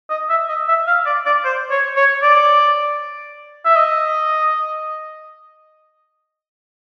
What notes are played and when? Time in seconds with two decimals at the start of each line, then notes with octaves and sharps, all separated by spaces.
0.10 D#5
0.30 E5
0.49 D#5
0.68 E5
0.87 F5
1.06 D5
1.26 D5
1.45 C5
1.71 C#5
1.97 C#5
2.23 D5
3.65 E5
3.76 D#5